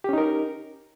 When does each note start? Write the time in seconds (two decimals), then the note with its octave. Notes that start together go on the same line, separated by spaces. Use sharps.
0.04 G4
0.09 C#4
0.13 D#4
0.18 A#4